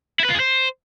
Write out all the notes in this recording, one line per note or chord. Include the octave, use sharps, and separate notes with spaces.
E4
B4
F4
G#4
C5